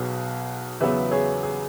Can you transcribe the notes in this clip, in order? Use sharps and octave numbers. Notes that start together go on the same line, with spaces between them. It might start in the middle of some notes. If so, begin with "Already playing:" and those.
Already playing: B1 B2 F#3 B3 G#4
E2 C#3 F#3 B3 B4 E5
G#4 C#5
G#4